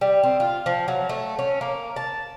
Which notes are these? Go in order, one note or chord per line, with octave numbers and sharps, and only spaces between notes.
G3
C4
F4
F3
F#3
A3
C#4
A#3
A5